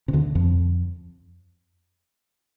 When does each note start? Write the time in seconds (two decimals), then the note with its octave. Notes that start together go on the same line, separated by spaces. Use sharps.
0.08 C3
0.13 D2 D3
0.35 F2 F3